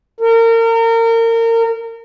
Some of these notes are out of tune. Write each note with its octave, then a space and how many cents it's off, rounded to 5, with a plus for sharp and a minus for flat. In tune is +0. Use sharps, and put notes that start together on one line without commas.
A#4 -30